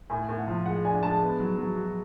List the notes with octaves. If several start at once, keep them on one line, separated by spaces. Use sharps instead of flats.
A2 G#5
A2
F#5
F3
G#3 F#5
D4 G#5
G#3 A5
B3
F#3
F#3
F#4